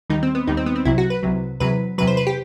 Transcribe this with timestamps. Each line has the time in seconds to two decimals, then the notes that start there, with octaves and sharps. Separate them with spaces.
0.10 D#2 D#3 G3 D#4
0.23 C4
0.35 B3
0.47 D#2 D#3 G3 D#4
0.57 C4
0.66 B3
0.76 C4
0.85 C2 C3 F#3 E4
0.98 F#4
1.10 B4
1.23 C2 C3 F#3
1.60 E2 C3 F#3 B4
1.98 E2 C3 F#3 B4
2.07 C5
2.17 B4
2.27 G4